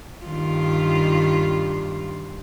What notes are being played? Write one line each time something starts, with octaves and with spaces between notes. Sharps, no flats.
G2 D#3 F4